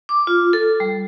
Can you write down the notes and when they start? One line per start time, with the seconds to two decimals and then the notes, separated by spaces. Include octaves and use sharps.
0.09 D6
0.27 F4
0.53 A4
0.80 G3